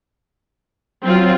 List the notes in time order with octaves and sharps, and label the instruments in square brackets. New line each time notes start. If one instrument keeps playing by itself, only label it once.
[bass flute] F#3 [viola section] C4 F4